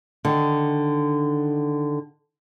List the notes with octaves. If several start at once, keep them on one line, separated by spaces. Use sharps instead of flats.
D3 D#3